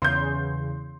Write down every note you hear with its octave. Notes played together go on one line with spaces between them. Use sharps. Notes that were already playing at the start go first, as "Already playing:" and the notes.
E2 C#3 C6 G6